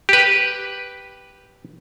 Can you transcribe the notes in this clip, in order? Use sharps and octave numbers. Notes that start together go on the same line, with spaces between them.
G4 B4